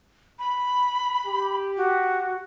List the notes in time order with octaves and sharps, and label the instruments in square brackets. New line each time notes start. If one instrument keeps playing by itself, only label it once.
[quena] B5
[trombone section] G4
[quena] F#4